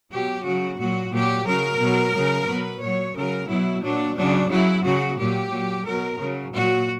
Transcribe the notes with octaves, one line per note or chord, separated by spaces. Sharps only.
B2 F#3 G4
C#3 F#3 F#4
A#2 F#3 F#4
A#2 F#3 G4
C#3 F#3 A#4
B2 F#3
C#3 F#3
B2 F#3 B4
A#2 F#3 C#5
C#3 F#3 A#4
B2 F#3 E4
A#2 F#3 D4
C#3 F#3 D4
C#3 F#3 E4
C#3 F#3 F#4
A#2 F#3 G4
A#2 F#3
B2 F#3 A#4
C#3 F#3
A#2 F#3 F#4